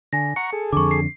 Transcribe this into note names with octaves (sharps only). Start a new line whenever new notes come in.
D3 G#5 A#6
F#5 A#5 C#6 C#7
G#4 A4
F2 D3 C#6 D6
C7